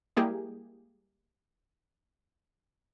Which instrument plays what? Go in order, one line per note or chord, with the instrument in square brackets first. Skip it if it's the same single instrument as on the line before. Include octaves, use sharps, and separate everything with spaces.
[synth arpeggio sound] G3 G#3 A#3 E4 G4 G#4